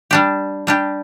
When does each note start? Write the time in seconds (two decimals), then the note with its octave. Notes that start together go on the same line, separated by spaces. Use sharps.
0.11 G3 D4 G4
0.67 G3 D4 G4